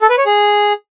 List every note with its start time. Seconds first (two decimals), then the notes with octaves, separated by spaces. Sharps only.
0.02 A4
0.10 B4
0.18 C#5
0.26 G#4